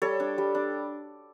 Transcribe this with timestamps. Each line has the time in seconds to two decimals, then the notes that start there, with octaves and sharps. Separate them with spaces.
0.02 G3 A4 C#5
0.20 D4
0.38 G3
0.55 D4